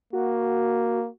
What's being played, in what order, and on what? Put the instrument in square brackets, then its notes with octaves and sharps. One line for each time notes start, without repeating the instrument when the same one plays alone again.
[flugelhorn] A#3 [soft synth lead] F#4